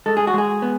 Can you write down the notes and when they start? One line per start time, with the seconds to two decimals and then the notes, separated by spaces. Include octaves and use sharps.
0.06 G#3 A4
0.17 G#4
0.27 F#4
0.34 G#3 G#4
0.62 B3